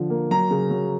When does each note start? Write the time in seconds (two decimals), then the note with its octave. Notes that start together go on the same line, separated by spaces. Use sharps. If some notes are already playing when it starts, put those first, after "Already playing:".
Already playing: D3 F3
0.10 A#3
0.31 F#3 A#5
0.51 C#3
0.71 F#3